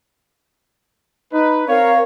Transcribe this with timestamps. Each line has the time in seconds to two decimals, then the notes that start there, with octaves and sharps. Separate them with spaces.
1.33 D#4 B4
1.68 C4 A#4 C#5 F5